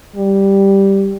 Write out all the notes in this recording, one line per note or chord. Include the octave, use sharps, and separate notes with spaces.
G3